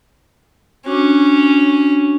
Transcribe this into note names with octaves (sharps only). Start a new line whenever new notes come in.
C#4 D4 F#4